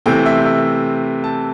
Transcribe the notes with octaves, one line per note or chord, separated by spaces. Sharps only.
C3 E3 A3 C4 G5
E5
E5
A5